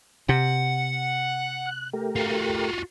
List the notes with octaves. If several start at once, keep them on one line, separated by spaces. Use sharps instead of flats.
C3 F#5
F#6
A3 G4 A#4
F4 F#4